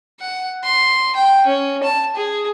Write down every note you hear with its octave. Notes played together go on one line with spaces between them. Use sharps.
F#5
C6
G5
C#4
A5
G#4